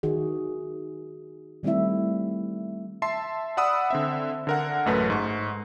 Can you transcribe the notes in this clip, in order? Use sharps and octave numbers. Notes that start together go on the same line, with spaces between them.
D#3 D#4 F#4 G#4
D#3 G3 A3 C4 E4 E5
E5 A5 C6 C7
D5 F#5 B5 D#6 E6
D3 C4 E5
D3 A#4 F#5
A1 F#2 A3 B4 A5
G#2 C#6